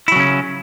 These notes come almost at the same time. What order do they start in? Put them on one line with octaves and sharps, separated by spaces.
E4 F#3 C#3 C#4